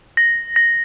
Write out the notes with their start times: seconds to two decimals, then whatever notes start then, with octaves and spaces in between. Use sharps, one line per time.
0.17 A#6
0.56 A#6